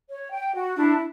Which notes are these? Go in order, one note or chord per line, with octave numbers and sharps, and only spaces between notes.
C#5
G5
F#4
D4 E4